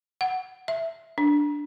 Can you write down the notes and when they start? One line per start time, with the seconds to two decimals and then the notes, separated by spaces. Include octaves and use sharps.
0.21 F#5
0.68 E5
1.18 D4